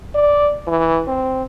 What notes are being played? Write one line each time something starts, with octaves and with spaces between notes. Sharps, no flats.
D5
E3
C4